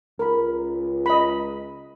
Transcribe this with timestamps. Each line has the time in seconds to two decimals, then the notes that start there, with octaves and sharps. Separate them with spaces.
0.19 C#2 A#4 B5
1.06 D#5 B5